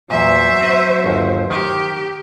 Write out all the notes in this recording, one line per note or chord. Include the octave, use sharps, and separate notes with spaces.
E2 A#2 F#3 C5 E5
C4 B4
G1 D#2
D#3 G4